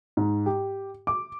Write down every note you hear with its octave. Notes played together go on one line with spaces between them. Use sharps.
G#2
G4
D6